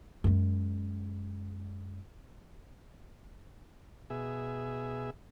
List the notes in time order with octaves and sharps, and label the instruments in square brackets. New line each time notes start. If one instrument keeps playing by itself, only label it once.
[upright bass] F#2 G#3
[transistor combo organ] B2 G#4 E5